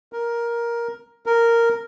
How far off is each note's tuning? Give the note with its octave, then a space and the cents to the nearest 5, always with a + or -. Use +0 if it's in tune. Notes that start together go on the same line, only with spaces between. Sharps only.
A#4 +10
A#4 -5